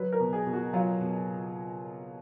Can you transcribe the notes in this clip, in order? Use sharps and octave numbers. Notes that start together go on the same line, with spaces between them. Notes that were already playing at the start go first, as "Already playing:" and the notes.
Already playing: F#3 B4
A#4
B2
G#4
B2
F#4
F#3 F4
B2